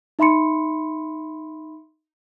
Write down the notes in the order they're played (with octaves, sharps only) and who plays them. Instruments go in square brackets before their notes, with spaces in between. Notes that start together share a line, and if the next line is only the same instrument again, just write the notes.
[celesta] D#4 E5 B5 C6 C#7